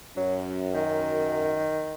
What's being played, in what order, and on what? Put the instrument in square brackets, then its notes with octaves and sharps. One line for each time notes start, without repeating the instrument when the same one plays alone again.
[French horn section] F#2 [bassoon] F#3
[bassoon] D#3